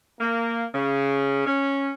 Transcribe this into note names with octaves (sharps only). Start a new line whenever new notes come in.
A#3
C#3
C#4